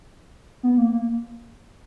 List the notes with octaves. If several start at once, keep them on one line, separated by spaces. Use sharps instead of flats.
B3
A#3
A#3